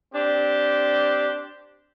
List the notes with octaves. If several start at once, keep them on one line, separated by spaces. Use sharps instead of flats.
C4 D4 G4